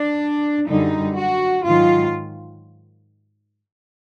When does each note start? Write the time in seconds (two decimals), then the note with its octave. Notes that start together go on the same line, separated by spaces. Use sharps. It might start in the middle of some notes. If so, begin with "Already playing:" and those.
Already playing: D4
0.68 F#2 D3 G3 D#4
1.17 F#4
1.65 G#2 D#3 F#3 F4